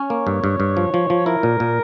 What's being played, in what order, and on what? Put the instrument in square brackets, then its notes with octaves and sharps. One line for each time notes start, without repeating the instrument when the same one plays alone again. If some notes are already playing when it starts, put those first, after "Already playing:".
Already playing: [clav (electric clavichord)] C#4 [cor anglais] C#5
[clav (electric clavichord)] A#3
G2
G2
G2
F3
F3
F3
[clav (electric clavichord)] E4 [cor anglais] A#4
[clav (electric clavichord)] A#2
A#2